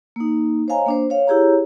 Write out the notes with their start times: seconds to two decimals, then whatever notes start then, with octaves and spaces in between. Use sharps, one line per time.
0.16 A#3 D#4
0.68 C5 C#5 D#5 F5 G#5 A#5
0.86 A#3 D4 C5
1.10 C#5 F5
1.27 E4 G4 G#4 C#5 A#5